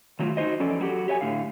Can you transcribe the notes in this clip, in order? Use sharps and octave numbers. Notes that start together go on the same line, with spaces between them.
D#3 F#3 A3 D#4 F4
D#4 F#4 C5 D#5
E2 F3 C#4 A4 D5
F#3 A#3 F#4 G4 A4
G4 C#5 D#5 G#5
A2 D3 F5